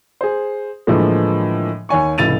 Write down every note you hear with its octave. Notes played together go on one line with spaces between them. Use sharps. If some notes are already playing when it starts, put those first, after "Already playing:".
G#4 C5
A2 D3 E3 F3 G#3 A#3
D#2 C#5 G#5 C#6
F1 C#2 A2 A6 D#7 F7